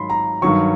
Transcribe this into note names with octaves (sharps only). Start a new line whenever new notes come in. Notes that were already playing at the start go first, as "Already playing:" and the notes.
Already playing: G#2 D#3 F#3 B5 C6
A#5
G2 D#3 F#3 C#6